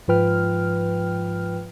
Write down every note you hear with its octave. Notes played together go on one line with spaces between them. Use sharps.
G#2 F3 F4 B4 G5 F6